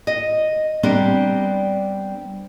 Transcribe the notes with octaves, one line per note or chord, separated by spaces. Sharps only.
D#5
G3 B3 C4 D4 A#4